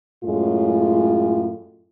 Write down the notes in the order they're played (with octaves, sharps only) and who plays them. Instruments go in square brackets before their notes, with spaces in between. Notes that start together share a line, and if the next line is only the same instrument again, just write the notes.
[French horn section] F#2 A2 G#3 F4